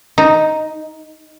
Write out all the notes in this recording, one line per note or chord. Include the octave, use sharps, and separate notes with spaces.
D#4